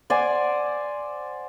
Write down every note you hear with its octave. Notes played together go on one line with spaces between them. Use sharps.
C5 D5 F#5 G#5